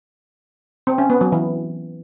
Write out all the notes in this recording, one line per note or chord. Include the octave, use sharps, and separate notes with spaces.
C4
C#4
B3
F#3
E3